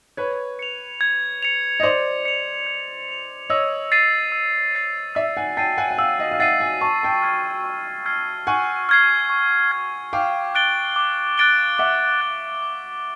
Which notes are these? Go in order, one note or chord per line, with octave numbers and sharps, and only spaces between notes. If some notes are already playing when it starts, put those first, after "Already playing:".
B4 C#5 G#6
C#7 F7
G#6
C#7 F7
D#5
C5 D5 G#6
C#7 F7
G#6
C#7 F7
C#5 D#5 E6
A6 C7 D#7
E6
A6 C7 D#7
D5 E5 E6
F#5 G#5
G5 A5 A6 C7 D#7
F#5 G#5
F#5
F5 G5 E6
D#5 F5
F5
E5 F#5 A6 C7 D#7
F#5 G#5
A5 C#6
G5 A5
F6 G#6 C7
C#6
F6 G#6 C7
F#5 G#5 C#6
F6 G#6 C7
C#6
F6 G#6 C7
F5 G5 D6
F#6 A6 D7 G7
D6
F#6 A6 D7 G7
E5 F#5 D6
F#6 A6 D7 G7
D6